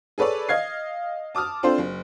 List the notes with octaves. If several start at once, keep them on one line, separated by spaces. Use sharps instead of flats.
G#4 A4 B4 C#5 D5
D#5 F5 G#6 C7
A5 D6 D#6 F6
C4 D4 F4 A4 C5
F#1